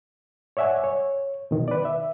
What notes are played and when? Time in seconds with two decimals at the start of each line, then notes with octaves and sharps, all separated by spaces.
0.57 C#5 D5 E5 F#5 G#5
0.84 C#5
1.51 B2 D#3
1.68 B4 D5
1.85 E5